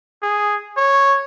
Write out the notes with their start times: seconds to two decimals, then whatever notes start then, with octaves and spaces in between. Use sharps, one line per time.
0.23 G#4
0.77 C#5